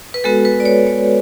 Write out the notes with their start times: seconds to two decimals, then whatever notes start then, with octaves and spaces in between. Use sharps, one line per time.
0.14 B4
0.24 G#3 B3 F#4 A4
0.45 B4
0.60 D5
0.65 C#5
0.87 C#5